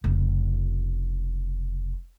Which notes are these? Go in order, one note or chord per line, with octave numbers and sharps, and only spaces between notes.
F1 C#3